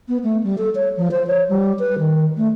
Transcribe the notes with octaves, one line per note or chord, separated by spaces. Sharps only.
B3
A3
G3
A4
C#5
F3
C5
C#5
G3
B4
D#3
A3